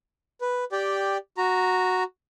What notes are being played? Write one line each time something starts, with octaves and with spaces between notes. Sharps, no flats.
B4
G4 D5 G5
F#4 A#5